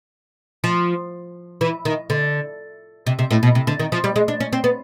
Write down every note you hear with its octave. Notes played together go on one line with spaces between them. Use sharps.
F3
E3
D#3
D3
C3
C3
A2
B2
C3
D3
D#3
F3
G3
G#3
D4
C#4
C4
B3